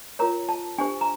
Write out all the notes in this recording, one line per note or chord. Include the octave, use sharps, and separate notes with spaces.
F4 A#4 C#5 A#5
A5
D4 G4 C5 G#5
A#5